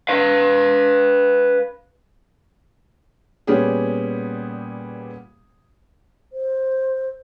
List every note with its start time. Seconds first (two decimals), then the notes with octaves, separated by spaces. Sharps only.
0.09 B4 F5
3.47 A#2 G3 B3 C#4 G4 G#4
6.33 C5